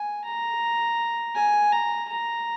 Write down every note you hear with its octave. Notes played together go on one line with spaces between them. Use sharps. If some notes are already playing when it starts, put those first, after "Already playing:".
Already playing: G#5
A#5
G#5
A#5
A#5